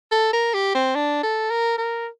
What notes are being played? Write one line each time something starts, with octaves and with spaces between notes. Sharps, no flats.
A4
A#4
G4
C4
D4
A4
A#4
A#4